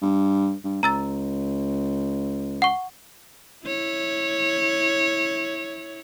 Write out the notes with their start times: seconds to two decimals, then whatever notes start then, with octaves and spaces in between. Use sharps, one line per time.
0.02 G2
0.64 G2
0.83 C#2 A#5 E6 A6
2.62 F#5 C#6
3.66 E4 C#5